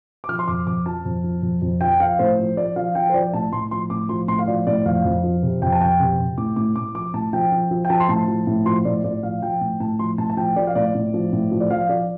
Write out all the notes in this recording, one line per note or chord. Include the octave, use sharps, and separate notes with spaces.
D6
F3 F6
C6
F2 D6
F2 D6
F3 A5
F2
F3
F2
F2
F3 G5
F3 F5
A2 C5
F3
F3 D5
F3 F5
F3 G5
C5
F3 D5
A2 A5
A2 C6
F3 C6
A2 D6
F3 C6
A2 C6
F5
F3 D5
A2 D5
F2 F5
F2
F3
C3
F2 G5
A5
F2 G5
C3
C3
A2 D6
A2 D6
A2 D6
F3 D6
A2 A5
F3 G5
F3
F3
G5
F3 A5
C6
A2 A5
F3
A2
F3 C6
A2 D5
A2 D5
F3 F5
F3 G5
A2
A2 A5
F3 C6
A2 A5
A5
F3 G5
F3 D5
F5
A2 D5
A2
F3
A2
F3
D5
F3 F5
F3 D5